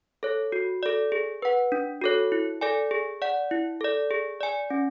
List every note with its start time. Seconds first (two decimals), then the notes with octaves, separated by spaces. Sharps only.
0.23 A4 C#5
0.52 F#4
0.83 A4 D5
1.12 G#4
1.42 B4 F#5
1.72 D4
2.02 F#4 A4 C#5
2.32 E4
2.61 A4 D5 G#5
2.91 G#4
3.22 D5 F#5
3.51 E4
3.81 A4 D5
4.11 G#4
4.41 D5 G#5
4.70 C#4